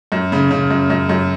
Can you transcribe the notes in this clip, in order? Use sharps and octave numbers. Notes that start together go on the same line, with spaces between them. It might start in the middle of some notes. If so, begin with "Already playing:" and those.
F#2
C#3
C#3
F#2
F#2
F#2